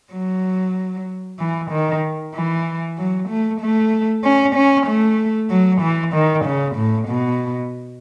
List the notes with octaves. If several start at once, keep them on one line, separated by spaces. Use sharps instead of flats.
F#3
E3
D#3
E3
F#3
A3
A3
C#4
C#4
A3
F#3
E3
D#3
C#3
A2
B2